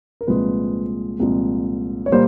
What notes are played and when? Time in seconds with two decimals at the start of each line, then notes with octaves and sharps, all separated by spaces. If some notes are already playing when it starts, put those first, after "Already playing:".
0.21 A#4
0.27 C2 A#2 F3 G#3 B4
1.20 C2 A#2 F3 G#3
2.06 C#5
2.12 A#2 G3 A#3 C5